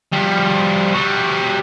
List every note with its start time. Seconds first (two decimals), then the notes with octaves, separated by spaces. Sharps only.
0.13 F3 G3
0.94 G3 F#4